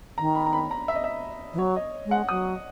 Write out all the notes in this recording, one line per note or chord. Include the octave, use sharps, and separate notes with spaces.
D#3 A#5
B5
A#5
B5
A#5
E5
D#5
E5
E3
F#3 C#5
D#5
G#3
F#5
F#3 D#6